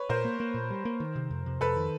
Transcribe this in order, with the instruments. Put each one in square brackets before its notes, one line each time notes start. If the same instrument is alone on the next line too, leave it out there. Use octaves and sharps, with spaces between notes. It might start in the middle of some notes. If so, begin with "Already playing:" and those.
Already playing: [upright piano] B4 C#5
[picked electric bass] A#2 [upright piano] A#4 C5
[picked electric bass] A#3
A#3
A#2
G3
A#3
D#3
C3
F2
C3
[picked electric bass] F2 [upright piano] A4 B4
[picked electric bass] D#3